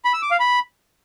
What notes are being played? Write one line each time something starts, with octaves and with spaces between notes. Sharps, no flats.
B5
E6
D6
F5
B5